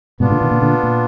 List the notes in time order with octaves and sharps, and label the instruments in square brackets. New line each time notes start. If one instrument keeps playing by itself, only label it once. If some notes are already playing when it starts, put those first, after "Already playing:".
[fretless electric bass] G#2 B2 [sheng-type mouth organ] B3 D4 F4
[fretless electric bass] A#2 D3
B2 D#3
A#2 D3
A#2 D3
A#2